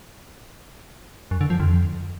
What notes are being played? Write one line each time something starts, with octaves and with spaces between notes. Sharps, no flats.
F#2
D3
F3
F2